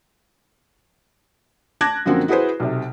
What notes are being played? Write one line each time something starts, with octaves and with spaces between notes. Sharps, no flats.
A5 D6 F#6 G#6 A#6
F#2 D3 F3 A#3 C4 F#4
E4 F#4 G#4 B4 C5
B1 C3